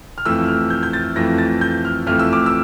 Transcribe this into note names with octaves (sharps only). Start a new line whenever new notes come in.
F6
F2 E3 A3 E6
F6
G6
G6
A6
F2 E3 A3 A#6
A6
G6
F6
F2 E3 A3 F6
E6
D6
E6